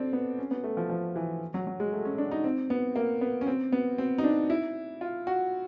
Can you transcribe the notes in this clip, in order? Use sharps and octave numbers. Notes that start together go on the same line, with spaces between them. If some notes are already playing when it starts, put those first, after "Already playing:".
Already playing: C4 D4 A4
B3
C#4
B3
A3
F3
F3
E3
F#3
F#3
G#3
A3
C#4
D4
D#4
C4
B3
A#3
B3
C#4
C4
B3
C4
D#4
D4
E4
F4
F#4